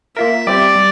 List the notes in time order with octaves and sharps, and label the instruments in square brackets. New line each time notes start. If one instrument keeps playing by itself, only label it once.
[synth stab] A#3 F4 A#4 [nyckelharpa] E5
[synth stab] G3 C4 G4 [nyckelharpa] D5
[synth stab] G3